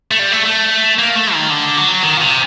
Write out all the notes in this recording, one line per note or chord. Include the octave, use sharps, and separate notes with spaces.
A3
G3
A3
A3
A#3
A3
D#3
D3
F#3
D#3
A#2
C3